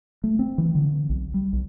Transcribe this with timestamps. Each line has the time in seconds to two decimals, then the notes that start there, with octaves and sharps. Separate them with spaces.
0.24 A3
0.39 C4
0.58 E3
0.75 D3
1.09 B1
1.34 G3
1.53 B1